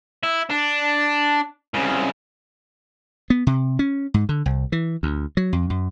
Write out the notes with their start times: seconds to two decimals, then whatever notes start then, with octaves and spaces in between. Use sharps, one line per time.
0.23 E4
0.50 D4
1.74 C2 C#3
3.30 B3
3.47 C3
3.79 C#4
4.14 G#2
4.29 D3
4.46 C2
4.72 E3
5.03 D2
5.37 F#3
5.53 F2
5.70 F#2